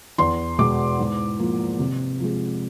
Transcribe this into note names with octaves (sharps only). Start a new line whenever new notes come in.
E2 C6
B2 G#3 B3 D6
G#2
F3 A#3
C3
F3 G#3